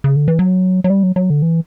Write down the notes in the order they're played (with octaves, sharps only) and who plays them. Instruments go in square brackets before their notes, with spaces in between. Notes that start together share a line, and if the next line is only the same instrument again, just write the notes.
[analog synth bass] C#3
D3
E3
F#3
F#3
G3
F#3
F#3
D3
E3